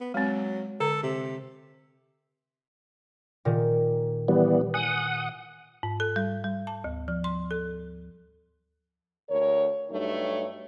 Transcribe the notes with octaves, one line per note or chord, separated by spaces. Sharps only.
B3
F#3 G#3 C4
D3 A4
C3
A#2 D#3
E3 G3 B3
F#5 G#5 D#6
G#2
A4
G3
G3
A5
D2
F3
C6
A4
D2 A#4 C#5
G2 F#3 A3 D#4 C#5